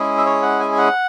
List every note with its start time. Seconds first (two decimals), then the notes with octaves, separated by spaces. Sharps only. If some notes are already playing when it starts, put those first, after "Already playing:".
Already playing: G#3 C#4 E4 G#4
0.18 E5
0.26 C#5
0.42 F#5
0.60 G#5
0.72 G#5
0.78 F#5